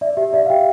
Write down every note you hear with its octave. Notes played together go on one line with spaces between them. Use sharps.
D5 E5
G4 E5
D5 E5
F5
G4 G5